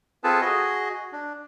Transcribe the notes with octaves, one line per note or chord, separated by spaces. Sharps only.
C4 F4 G#4 A4 B4 A5
F#4 G#4 D#5
D4